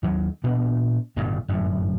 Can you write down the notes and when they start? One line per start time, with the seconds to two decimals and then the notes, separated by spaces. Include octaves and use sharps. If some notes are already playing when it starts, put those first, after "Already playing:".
0.03 D#2 F#3
0.44 A#2 B3 D4
1.16 D1 G1 G2 B2
1.48 G1 F#2 A2